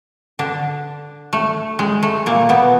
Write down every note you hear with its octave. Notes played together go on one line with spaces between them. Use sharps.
D3 D4
A3
G#3
A3
A#2 A#3
B2 B3